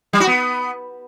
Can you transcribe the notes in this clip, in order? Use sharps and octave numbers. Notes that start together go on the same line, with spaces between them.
G3
F#4
B3